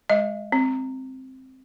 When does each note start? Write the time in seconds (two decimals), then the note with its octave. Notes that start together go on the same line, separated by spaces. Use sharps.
0.10 G#3 D#5
0.52 C4